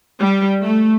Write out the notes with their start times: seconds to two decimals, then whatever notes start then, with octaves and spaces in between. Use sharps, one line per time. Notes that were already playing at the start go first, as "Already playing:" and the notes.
0.18 G3
0.62 A3